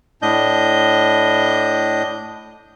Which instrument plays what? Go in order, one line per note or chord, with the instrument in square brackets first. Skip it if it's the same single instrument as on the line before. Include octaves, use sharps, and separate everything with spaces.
[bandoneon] A2 D4 D#5 G6